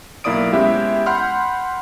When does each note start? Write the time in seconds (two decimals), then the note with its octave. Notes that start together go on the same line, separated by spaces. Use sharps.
0.24 B1 A#3 E4 D5 D#6 D7
0.52 G#3 B3 C#4 E4 G4 E5
1.06 F#5 B5 C6 F6 G6